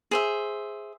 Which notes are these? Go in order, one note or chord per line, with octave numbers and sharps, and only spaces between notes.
G#4 C5 E5